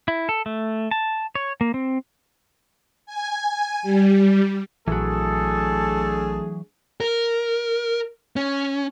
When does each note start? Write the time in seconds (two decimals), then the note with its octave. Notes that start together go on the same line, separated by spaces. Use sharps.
0.08 E4
0.29 A4
0.46 A3
0.91 A5
1.35 C#5
1.61 A#3
1.74 C4
3.06 G#5
3.83 G3
4.88 A#1 E3 F#3 A3 D4 G#4 A4
7.01 A#4
8.36 C#4